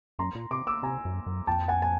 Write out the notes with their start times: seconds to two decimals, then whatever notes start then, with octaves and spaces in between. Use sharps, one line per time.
0.19 F#2 A#5 C6
0.35 A#2
0.51 C3 C6 D6
0.67 D6 E6
0.83 C3 G#5 A#5
1.05 F#2
1.26 F#2
1.47 F2 G5 A5
1.68 F#5 G#5
1.82 G#5